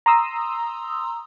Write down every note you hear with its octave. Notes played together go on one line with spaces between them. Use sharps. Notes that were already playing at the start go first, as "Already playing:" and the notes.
A#5 C6 D#6 E6